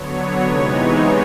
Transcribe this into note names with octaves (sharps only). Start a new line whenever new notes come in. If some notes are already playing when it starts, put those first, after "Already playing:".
Already playing: D3 F#3 B3 C#5
C3 E3 G#3 B3 D#4 C#5